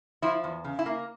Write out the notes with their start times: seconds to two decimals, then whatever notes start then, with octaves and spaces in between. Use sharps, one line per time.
0.22 F3 E4
0.44 E2
0.64 C#3
0.79 E4
0.86 A#3